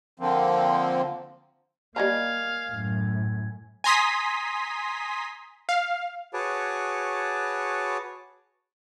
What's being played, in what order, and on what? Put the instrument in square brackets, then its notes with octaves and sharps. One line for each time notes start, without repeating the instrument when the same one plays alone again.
[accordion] D3 F3 A#3 C4
[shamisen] G3 D#5 A#5 [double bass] A#3 [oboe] F5 [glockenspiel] G#5 G#6
[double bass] F#2 A2
[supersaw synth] G#5 A#5 C6 D#6 B6
F5
[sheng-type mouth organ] F#4 G#4 B4 C#5 A5 D6